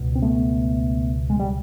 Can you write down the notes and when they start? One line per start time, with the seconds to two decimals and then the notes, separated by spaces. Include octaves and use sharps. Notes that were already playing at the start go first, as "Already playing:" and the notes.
Already playing: C#2 B2
0.15 C4
0.22 A3 B3
1.30 G#3
1.39 G3